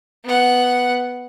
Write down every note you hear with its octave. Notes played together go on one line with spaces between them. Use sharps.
B3 F#5